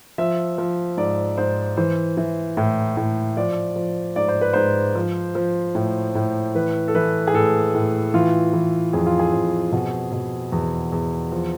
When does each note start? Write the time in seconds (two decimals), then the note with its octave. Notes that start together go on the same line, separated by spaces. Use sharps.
0.18 F3 E5
0.58 F3
0.97 G#2 D5
1.37 G#2 C5
1.77 E3 C5
2.17 E3
2.57 A2
2.97 A2
3.37 F3 D5
3.76 F3
4.16 G#2 D5
4.28 C5
4.41 B4
4.53 G#2 C5
4.95 F3
5.35 F3
5.75 A2
6.15 A2
6.55 E3 B4
6.88 A4
6.95 E3 B4
7.27 G#4
7.34 A2 A4
7.75 A2
8.14 E3 F4
8.53 E3
8.93 F2 G#4
9.06 F4
9.19 G#4
9.33 F2
9.72 B2
10.12 B2
10.52 E2
10.92 E2
11.32 F3